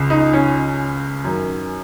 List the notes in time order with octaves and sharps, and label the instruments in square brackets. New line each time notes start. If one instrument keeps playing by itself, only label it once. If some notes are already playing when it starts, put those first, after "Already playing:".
Already playing: [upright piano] C#2 C#3
D#4
C#4
F#2 D#3